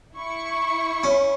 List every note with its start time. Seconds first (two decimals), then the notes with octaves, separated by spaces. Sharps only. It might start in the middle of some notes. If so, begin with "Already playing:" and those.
0.17 E4 C#6
1.03 C#4